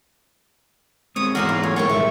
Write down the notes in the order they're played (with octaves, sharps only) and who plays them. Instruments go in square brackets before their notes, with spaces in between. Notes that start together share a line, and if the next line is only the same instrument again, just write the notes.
[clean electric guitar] G3 G#3 C4 [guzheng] C#5 [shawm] D#6
[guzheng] E2 G#2 E4 [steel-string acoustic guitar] F#4 [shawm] A#4 [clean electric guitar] D5
[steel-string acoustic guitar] F4
[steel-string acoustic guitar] F#2 [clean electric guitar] A3 [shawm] C#5
[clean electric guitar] G#3 A#3 [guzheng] F4 [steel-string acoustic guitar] A#4 D#5 G5 [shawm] C#6
[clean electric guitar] A#2 D#3 G3 [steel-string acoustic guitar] E5